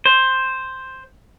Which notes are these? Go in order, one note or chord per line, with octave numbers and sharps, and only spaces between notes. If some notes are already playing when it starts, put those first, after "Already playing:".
C5